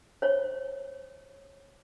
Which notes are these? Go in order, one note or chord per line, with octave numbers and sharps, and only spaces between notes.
C5 C#5